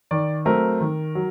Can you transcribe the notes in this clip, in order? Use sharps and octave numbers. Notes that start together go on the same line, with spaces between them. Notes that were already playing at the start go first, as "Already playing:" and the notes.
D#3 D5
F#3 A3 C4 A#4
D#3
F#3